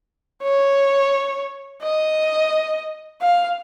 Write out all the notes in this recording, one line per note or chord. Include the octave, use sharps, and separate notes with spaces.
C#5
D#5
F5